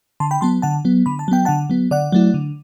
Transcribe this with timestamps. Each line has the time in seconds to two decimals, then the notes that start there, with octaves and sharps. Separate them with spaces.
0.20 D3 A5 C6
0.31 G5 B5
0.41 F#3 B3 A5 C6
0.62 D3 F#5 A5
0.85 F#3 B3
1.06 D3 B5
1.19 A5
1.28 F#3 B3 G5
1.45 D3 F#5 A5
1.70 F#3 B3
1.91 D3 D5 F#5
2.12 F#3 A3 E4
2.34 D3